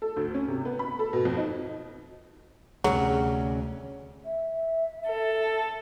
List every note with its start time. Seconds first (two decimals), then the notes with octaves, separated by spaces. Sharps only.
0.02 A4
0.17 D2
0.34 C#4
0.48 C3
0.65 B3
0.79 B5
0.99 A4
1.13 B2
1.25 F2
1.37 D#4
2.84 D2 C3 F#3 G3 C#4 G#4
4.25 E5
5.09 A4